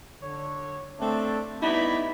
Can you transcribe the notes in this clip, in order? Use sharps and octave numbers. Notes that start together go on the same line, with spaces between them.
D3 C#5
A3 C4 D4
G2 B3 D#4 E4 D5 B5